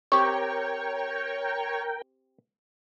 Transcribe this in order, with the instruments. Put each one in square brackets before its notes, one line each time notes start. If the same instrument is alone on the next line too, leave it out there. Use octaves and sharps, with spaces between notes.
[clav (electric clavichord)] C4 G4 [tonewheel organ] A#4 G5 [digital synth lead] C#5 [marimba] C#6